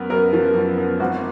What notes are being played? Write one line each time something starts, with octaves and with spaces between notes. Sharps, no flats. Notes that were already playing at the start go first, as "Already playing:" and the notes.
Already playing: F#2 B3 A#4 B4
F#2 A#4
F3
F#2
B3
G#1 F#4